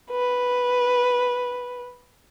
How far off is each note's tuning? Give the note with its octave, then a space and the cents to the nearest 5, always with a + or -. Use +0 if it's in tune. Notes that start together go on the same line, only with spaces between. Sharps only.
B4 -5